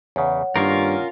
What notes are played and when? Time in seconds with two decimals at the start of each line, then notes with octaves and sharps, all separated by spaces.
0.16 E2 C#3 C#5 F#5
0.56 G2 D#3 A#3 C#4 F4 A#4